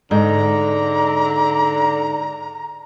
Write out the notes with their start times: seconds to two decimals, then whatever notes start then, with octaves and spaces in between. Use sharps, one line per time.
0.11 G#2 D3 A#5